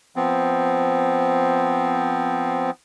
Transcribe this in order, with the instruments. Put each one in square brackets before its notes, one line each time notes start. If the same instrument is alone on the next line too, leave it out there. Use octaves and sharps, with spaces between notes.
[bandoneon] F3 B3 C4